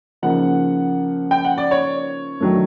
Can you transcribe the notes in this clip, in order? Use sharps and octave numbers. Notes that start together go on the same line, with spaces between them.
C#3 F3 A#3 D#4 F#5
G5
F#5
D5
C#5
D#3 F#3 A3 D4